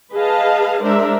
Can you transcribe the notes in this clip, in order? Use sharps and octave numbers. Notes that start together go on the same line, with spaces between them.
G#4 B4 D#5 F5 A5
G#3 D4 A#4 C5 E5